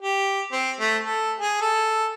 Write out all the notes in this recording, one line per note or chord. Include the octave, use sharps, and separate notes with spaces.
G4
C4
A3
A4
G#4
A4